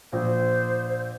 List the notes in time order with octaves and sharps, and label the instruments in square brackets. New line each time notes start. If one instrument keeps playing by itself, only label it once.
[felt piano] A#1 [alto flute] C5